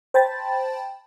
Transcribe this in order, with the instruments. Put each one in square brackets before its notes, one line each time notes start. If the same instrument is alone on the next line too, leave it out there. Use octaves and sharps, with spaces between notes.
[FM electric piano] C5 G5 A5 B5 A6